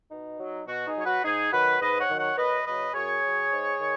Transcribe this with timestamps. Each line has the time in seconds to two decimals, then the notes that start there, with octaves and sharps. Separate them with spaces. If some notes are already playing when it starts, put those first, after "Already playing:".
0.12 B2 D#4
0.40 F#3
0.68 B2 F#4
0.87 D#4 G#4
0.96 F#3 C#5
1.06 F#4 B4
1.25 G#2 D#4 G#4
1.53 D#3 F#3 F#4 B4
1.81 G#2 B4 D#5
2.00 C#5 F#5
2.09 D#3 F#3
2.19 C#5 F#5
2.37 F#2 B4 D#5
2.66 C#3 F#3 B4 D#5
2.94 F#2 G#4 C#5
3.22 C#3 F#3
3.51 G#2
3.79 D#3